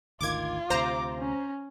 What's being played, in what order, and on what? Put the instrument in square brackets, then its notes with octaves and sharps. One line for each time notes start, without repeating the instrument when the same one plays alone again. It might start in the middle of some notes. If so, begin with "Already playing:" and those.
[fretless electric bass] G#1 D2 D#3 [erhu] F4 [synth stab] D6 G#6
[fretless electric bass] D2 C3 [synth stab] C5 A#5 [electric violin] D6
[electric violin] C#4